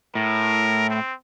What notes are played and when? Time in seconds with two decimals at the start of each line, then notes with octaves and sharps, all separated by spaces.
0.15 A2 A#4
0.90 C4